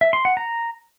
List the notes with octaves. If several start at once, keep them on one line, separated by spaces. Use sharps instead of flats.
E5
C6
F#5
A#5